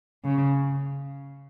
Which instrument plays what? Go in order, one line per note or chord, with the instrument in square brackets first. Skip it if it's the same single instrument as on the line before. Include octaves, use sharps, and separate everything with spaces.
[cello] C#3